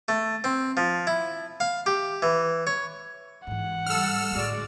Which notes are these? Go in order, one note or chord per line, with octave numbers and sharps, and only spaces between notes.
A3
C4
F3
E4
F5
G4
E3
C#5
G#2 E3 F#5
G3 A4 E6 F6
A2 D3 G#3 F#4 D5